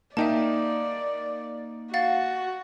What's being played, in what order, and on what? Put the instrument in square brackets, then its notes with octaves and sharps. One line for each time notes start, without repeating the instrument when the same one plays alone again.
[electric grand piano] A#3 D#4 [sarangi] D5 [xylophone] E5 G5 A5
[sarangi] F#4 [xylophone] F5 F#5 A6